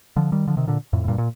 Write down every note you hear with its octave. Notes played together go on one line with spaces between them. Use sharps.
D3 F3
D#3 G3
D3 F3
C3 D#3
A#2 D3
F2 A2
A2
G2 A#2
A#2